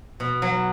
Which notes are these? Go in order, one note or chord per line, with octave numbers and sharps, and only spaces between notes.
B2
F#3